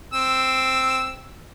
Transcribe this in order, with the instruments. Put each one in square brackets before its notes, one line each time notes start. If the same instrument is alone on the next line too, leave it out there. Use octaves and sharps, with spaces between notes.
[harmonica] C4 E6